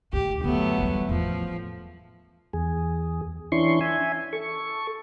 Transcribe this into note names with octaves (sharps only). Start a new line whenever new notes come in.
D2 G#2 G4
F#2 D3 F#3 A3 B3
E2 G3
E2 A2 F3
E2 G#4
E3 C#4 D4 E4 C6 C#6
E5 G#5
A4 C#6